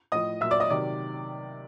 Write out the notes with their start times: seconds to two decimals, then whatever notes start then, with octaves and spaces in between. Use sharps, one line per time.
0.12 A2 F3 D#5 D#6
0.41 A#2 F#3 E5 E6
0.51 D5 D6
0.60 D#5 D#6
0.70 C3 D#3 F#3 D5 D6